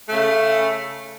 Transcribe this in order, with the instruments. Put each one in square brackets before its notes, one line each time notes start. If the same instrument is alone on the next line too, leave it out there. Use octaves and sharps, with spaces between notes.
[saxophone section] C#3 A3